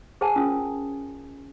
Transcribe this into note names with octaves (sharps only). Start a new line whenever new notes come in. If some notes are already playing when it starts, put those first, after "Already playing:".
G#4 C5 C#5 F#5 G#5 A5
C#4 F4 A#4 D#6